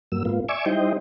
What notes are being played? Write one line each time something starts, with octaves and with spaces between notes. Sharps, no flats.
G2 F#3 A#3 E6
G#2 A#3 B3 F4
D5 E5 G#5 C#6 D6 E6
G3 D#4 E4 C5 D#5 G5